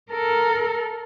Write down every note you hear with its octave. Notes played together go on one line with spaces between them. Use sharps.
A4 A#4